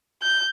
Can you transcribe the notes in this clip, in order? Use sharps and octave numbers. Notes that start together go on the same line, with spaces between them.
G6